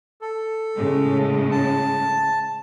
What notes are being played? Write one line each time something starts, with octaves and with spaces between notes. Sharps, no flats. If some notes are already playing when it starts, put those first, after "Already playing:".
A4
A2 C#3 G#3
A5